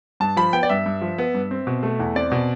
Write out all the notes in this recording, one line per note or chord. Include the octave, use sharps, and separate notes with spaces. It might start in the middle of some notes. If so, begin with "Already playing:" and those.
G2 A5
F3 B5
B3 G5
D5
G2 E5
G2
F3
B3
G2
C4
B2
A3
E2
C4 D5
B2